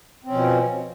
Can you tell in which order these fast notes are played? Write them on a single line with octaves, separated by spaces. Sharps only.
C4 C#4 B2 F3